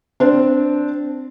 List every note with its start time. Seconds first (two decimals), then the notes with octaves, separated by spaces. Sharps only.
0.20 C4 D4